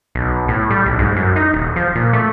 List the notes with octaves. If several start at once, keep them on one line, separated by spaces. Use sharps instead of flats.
B1
A2
G3
B1
G#2
F#2
D#4
D#1
F3
A#2
A3